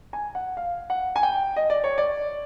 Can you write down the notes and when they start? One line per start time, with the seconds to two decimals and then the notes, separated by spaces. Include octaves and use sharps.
0.13 G#5
0.35 F#5
0.57 F5
0.90 F#5
1.16 G#5
1.23 G5
1.56 D#5
1.70 D5
1.84 C#5
1.98 D5